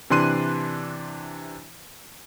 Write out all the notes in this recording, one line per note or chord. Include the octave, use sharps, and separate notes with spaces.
C3 E3 D4 C6 F#6 D#7